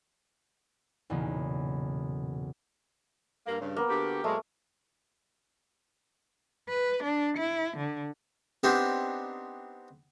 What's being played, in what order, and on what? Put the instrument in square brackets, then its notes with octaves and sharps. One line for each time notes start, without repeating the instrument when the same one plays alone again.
[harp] B1 E2 A#2 C#3
[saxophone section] G2 A#3
G2 C#3
[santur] A#3 B3
[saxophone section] D3 F#4 G4
[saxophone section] A#2 F#3 G#3 [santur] A3
[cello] B4
D4
E4
D3
[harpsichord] B3 C4 D4 D#4 G4